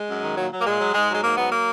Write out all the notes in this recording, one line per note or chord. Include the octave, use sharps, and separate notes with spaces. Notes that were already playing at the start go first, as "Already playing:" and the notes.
Already playing: G#3
F#2
D#3
A#2 F#3
F#3
A#3
A#2 G#3
F#3
G#2 G#3
F#3
G#3
G#2 A#3
F#3 B3
A#3